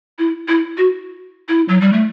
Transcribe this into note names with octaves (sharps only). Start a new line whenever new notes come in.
E4
E4
F#4
E4
F#3
G3
A3